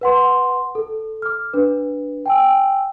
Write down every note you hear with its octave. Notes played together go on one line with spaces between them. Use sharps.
B4 F#5 C6
A4
D6 F6
D4 B4
G5 G#5 E6